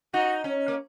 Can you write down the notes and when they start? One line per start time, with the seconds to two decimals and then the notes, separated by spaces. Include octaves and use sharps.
0.14 D#4 F#4
0.44 C#4
0.68 A#3